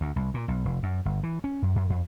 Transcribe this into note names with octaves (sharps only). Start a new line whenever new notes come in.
D2
C2
A#2
B1
F1
F#2
G1
E3
C#4
F#2
F#2
F2